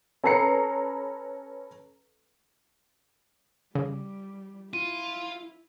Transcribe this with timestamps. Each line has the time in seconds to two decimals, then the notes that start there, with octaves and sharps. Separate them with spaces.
0.24 C#4 A4 B4 A#5 C7 C#7
3.75 C#3 G3
4.73 E4 F4 D#7